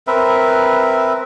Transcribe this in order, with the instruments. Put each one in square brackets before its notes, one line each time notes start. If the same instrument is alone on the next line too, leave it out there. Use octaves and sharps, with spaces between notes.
[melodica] C4 A#4 B4 E5